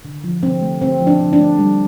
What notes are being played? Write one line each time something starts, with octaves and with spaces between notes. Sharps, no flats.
D3
F3
D3 C4
A3
D3 C4
F3
D4
D3
D4
A3
G3